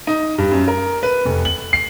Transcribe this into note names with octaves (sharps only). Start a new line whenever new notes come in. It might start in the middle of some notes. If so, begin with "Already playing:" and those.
D#4
G2
F#2
A#4
B4
F1
F#7
C7